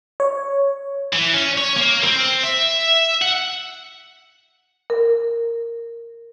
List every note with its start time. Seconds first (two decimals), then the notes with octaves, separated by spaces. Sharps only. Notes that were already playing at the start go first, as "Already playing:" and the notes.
0.20 C#5
1.13 E3
1.34 C#4
1.58 C#5
1.76 A#3
2.04 C4
2.43 E5
3.22 F#5
4.90 A#4